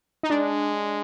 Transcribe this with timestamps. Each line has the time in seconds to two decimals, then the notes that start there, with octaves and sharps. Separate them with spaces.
0.23 D#4
0.30 G#3 D4